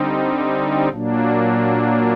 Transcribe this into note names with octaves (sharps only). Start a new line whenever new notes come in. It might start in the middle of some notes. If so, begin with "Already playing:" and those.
Already playing: D3 G3 C4 D#4
A#2 F#3 A#3 D4